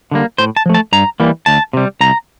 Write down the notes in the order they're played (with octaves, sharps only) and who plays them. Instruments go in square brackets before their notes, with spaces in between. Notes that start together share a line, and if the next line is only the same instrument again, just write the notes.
[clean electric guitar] D3 G3 A#3
A2 C5
A5
F3 A3
A5
G2 A#5
E3 G3 A#3
D2 A5
C3 G3
C2 A#5